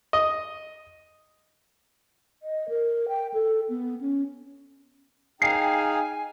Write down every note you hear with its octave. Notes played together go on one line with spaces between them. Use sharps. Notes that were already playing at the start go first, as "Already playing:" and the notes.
D#5
D#5
A#4
G5
A4
B3
C#4
D#4 G#4 F5 G5 G#5 C7